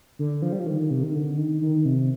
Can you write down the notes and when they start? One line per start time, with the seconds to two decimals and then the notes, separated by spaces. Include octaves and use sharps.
0.19 D3
0.42 F3
0.52 G3
0.59 F3
0.67 D#3
0.90 C3
1.03 D#3
1.14 D3
1.38 D#3
1.62 D#3
1.85 C3